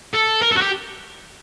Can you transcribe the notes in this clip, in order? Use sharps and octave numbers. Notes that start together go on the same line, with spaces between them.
A4
A#4
A4
F#4
G4